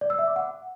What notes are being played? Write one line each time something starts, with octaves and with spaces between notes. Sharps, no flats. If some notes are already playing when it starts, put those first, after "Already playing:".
D5
E6
E5
D6
F#5